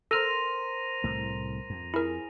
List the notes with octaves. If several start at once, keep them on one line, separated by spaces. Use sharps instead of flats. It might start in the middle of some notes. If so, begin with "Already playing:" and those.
A4 A#4 C5 F6 A#6 D#7 F7
C2 A2 A3
F2
E4 G#4 A#4